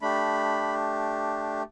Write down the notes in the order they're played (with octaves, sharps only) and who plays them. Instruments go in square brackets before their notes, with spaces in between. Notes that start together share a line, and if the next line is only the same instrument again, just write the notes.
[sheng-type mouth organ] A3 D4 G4 B5